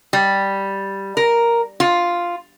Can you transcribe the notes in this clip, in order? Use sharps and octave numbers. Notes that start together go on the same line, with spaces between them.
G3
A#4
F4